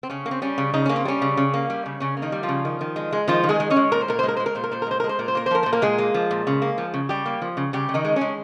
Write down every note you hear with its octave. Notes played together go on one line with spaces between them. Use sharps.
C4
C#3 C#4
A#3
C4
G3 C#4
C#3
C#3 D#4
A#3 C#4
C4
G3 C#4
C#3
C#3
A#3
G3
C#3
C#3 C#4
A#3
D#3 D#4
G3
F3 F4
C#3
D#3
D#3
G#3
G#3
D#3 F3 F4
D#3
G#3 G#4
G#3
C#4 C#5
G#3
A#2 A#4
C5
A#2 A#4
C5
G#3
A#4
G#3 C5
A#4
A#2 C5
A#4
A#2 C5
A#4
G#3 C5
G#3 A#4
C5
A#2 A#4
C5
A#3 A#4
C5
F3 A#4
A#2 C5
A#3 A#4
A#2 G#3 G#4
A#3
F3
A#2
C#3
A#3
F3
C#3
C#3 G3 G4
A#3
F3
C#3
C#3 G3 G4
C#3
D#3 D#4
G#3
G#3 C#4